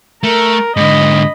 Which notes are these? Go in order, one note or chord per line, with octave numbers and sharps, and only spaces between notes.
A3 A#4
G#2 D3 D#5 B5